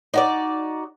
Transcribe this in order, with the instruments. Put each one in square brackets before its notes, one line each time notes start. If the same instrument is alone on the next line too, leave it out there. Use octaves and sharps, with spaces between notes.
[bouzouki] D#4 F#4 D5